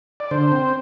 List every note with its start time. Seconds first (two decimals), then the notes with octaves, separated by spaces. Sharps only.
0.20 D5
0.31 D3 C5
0.52 C4